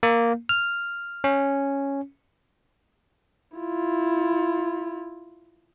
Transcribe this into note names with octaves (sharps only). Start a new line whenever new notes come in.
A#3
F6
C#4
E4 F4